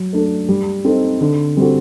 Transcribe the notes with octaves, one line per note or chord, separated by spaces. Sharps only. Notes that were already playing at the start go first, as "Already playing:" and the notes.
Already playing: F#3
A3 D4 A4
G3
C4 D#4 A4
D3
G3 C4 F#4 A4